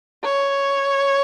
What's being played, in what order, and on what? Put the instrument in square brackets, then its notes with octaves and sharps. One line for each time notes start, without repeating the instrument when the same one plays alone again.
[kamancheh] C#5